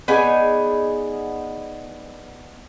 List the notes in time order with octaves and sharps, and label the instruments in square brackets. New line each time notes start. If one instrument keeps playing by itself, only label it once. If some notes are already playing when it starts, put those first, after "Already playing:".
[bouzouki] B3 D#4 G#4 D5